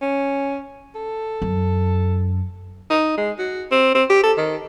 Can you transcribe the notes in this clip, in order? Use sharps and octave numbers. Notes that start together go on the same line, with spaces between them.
C#4
A4
F#2
D#4
G#3
F#4
C4
C4
G4
A4
D#3